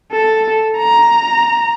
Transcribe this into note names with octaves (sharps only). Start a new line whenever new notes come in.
A4
A#5